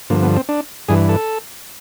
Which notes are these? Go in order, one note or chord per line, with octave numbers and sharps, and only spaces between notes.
G2 D3 F3 A#3
B3
C4
D4
G2 E3 G#4
A4